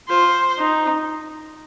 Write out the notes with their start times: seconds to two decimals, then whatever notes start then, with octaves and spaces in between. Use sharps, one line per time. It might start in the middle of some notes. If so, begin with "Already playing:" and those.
0.09 F4 C5
0.58 D#4